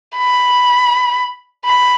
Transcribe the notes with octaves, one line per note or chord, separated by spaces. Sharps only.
B5
B5